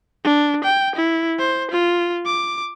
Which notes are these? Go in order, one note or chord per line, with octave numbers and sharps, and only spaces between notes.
D4
G5
E4
C5
F4
D6